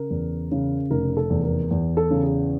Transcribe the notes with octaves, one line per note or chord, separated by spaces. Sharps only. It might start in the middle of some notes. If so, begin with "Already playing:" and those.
Already playing: C#3 A#4
E2
C#3
F1 A#4
A4
E2
A#4
E2
A4
C#3
G#4